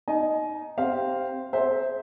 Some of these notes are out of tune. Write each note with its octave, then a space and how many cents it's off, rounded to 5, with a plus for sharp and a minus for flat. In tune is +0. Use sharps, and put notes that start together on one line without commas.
D#4 +0 D#5 +0 G#5 +40
C4 +0 G4 +0 F5 +0
G#4 +40 C5 +0 E5 -10